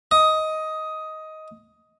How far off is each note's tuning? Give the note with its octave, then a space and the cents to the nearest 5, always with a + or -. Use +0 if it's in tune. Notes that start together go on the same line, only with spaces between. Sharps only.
D#5 +10